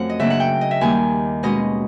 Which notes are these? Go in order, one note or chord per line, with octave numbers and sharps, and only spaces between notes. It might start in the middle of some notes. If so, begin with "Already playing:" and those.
Already playing: F#2 F3 A3 C4 F#5
D#5
C#3 F#3 A#3 D4 E5
F#5
G5
D#5
E5
D#2 D#3 G3 A#3 G#5
B2 G#3 C#4 D#5